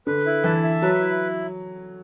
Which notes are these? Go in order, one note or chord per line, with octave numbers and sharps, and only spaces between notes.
D3 B4
E4
E3 A5
E5
F#3 B4
E4